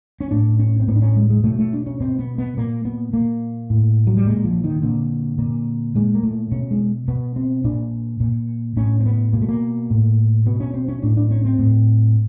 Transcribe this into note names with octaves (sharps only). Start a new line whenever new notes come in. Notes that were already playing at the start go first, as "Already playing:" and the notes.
C#4
A2 D4
C#4
C4
A2 B3
D4
C#4
G#3
G#3
B2 A3
A3
D4
C#4
B2 C4
B3
B3
A#2 A#3
B3
A#2 A#3
A2
F#3
G3
A#2 G#3
F3
D#3
A#2 D3
A#2
A#2 G#3
A#3
A3
B2 C#4
G#3
B2 B3
C4
A#2 D4
A#2
A2 C#4
C4
B3
B2 A#3
A3
A#3
A2
B2 B3
C#4
C4
C#4
A2 D4
D4
C#4
C4
A2